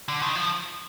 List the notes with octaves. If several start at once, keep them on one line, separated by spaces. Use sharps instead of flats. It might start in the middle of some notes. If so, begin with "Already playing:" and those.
D3
D#3
F3